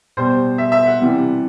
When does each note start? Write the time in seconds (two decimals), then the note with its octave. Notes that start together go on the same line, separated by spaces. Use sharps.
0.17 B2 G3 C5
0.58 E5
0.72 E5
0.86 F#5
1.00 C3 E3 G3